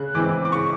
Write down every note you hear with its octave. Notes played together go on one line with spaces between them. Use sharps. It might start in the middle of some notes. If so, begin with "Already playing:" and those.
Already playing: C#3 F#6
E3 G#3 C4 D6
D6
C#3 C#6